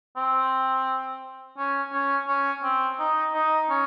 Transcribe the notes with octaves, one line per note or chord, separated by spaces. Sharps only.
C4
C#4
C#4
C#4
C4
D#4
D#4
C#4